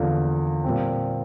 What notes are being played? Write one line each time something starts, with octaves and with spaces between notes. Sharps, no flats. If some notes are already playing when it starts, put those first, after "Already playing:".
Already playing: E2 D3 F3 A#3
A#2 G3 C4